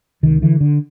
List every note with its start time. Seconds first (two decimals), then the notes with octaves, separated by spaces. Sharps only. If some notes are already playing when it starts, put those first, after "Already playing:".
0.23 C#2 C3 D#3
0.42 D3 E3
0.61 D3